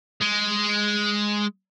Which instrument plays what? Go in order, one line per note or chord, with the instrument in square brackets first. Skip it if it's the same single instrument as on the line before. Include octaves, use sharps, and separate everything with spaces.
[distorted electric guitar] G#3